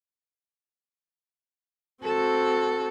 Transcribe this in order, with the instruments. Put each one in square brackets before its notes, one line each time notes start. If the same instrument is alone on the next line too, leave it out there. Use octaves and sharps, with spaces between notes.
[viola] C4 F#4 [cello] A4